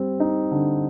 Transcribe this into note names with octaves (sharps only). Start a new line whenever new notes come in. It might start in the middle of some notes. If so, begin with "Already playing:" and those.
Already playing: G3 C4
D#4
D3